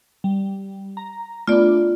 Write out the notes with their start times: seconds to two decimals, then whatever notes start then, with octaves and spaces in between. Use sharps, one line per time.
0.24 G3
0.97 A#5
1.48 A3 B3 D4 F4 D5